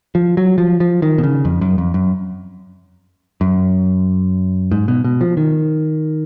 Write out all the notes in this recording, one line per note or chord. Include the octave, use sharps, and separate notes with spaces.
F3
F#3
F3
F3
D#3
B2
C#3
F2
F#2
F2
F#2
F#2
G#2
B2
B2
F3
D#3